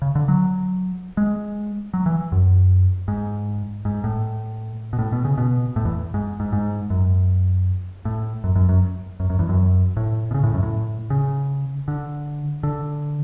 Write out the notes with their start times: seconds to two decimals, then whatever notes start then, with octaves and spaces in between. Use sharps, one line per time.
0.02 C#3
0.15 D3
0.28 F#3
1.17 G#3
1.94 F#3
2.06 E3
2.32 F#2
3.08 G#2
3.85 G#2
4.04 A2
4.93 B2
4.99 A2
5.12 B2
5.25 C#3
5.38 B2
5.76 A2
5.85 E2
6.14 G#2
6.40 G#2
6.53 G#2
6.90 F#2
8.05 A2
8.44 F#2
8.56 F#2
8.69 F#2
9.20 F#2
9.30 F#2
9.39 E2
9.49 F#2
9.97 A2
10.31 B2
10.34 C#3
10.43 A2
10.54 F#2
10.63 A2
11.10 C#3
11.88 D3
12.63 D3